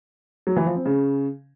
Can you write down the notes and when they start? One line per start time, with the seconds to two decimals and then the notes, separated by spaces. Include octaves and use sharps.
0.47 F#3
0.56 E3
0.66 F3
0.76 C4
0.86 C#3